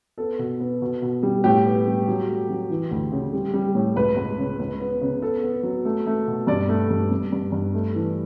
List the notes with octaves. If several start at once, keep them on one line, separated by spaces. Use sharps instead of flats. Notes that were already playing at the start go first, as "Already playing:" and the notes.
B3 A4
B2
B3
B2
B2
G3
A2 G4
B3
G3
F#3
A3
F#3
E3
D2
C#3
G3
G3
A2
C#2 B4
C#2
C#3
C#2
B3
C#3
B3 A4
B3
F#3
A3
A3
B2
G2 D5
A3
G2
G2
G2
G2
A3
E3